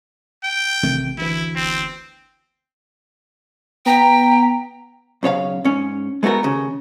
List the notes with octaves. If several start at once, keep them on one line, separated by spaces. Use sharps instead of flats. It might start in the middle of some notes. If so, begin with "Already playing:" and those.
G5
A1 C3 D#3 A3
D2 E3 E4
G1 C4
B3 G5 A#5 B6
B1 C#3 C#5 F5
G#2 C#4
G#3 A3 B3 F#4 A#4
D#2 C#3